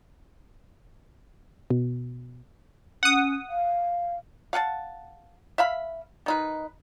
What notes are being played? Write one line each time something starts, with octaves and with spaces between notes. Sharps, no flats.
B2
C#4 F#5 D#6
F5
F5 F#5 G#5 A5
E5 F5 B5
D#3 D#4 B4